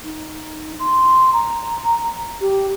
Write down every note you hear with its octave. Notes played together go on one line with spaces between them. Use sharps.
D#4
C6
A#5
G4